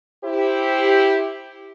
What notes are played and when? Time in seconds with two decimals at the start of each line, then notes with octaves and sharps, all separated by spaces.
0.24 E4 G4 C5